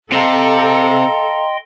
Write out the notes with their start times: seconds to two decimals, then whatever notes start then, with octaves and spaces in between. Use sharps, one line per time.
0.12 C3 A4 D#5 F5 G5 A#5 C6